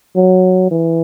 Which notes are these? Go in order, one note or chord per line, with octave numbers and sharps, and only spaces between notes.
F#3
E3